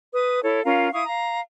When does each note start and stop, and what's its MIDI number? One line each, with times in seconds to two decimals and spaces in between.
0.13 0.41 71
0.13 0.41 87
0.43 0.63 64
0.43 0.63 69
0.43 0.63 73
0.65 0.89 61
0.65 0.89 65
0.65 0.89 70
0.65 0.89 77
0.92 1.04 64
0.92 1.04 77
0.92 1.04 85
0.92 1.04 87
1.05 1.41 77
1.05 1.41 82